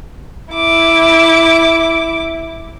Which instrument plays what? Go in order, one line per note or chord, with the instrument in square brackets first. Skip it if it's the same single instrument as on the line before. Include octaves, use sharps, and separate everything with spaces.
[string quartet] E4 D6